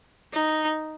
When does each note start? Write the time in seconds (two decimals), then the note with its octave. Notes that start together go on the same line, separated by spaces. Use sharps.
0.34 D#4